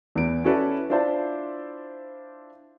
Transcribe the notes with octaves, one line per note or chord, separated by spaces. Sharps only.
E2 B3 D7
C#4 E4 F#4 A4 B4 D5
D4 E4 F4 C5 D5 A5